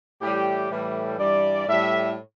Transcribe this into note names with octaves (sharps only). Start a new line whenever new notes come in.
A2 E3 G3 G4
A2 E3 G3
G2 E3 G3 D5
A2 G3 E5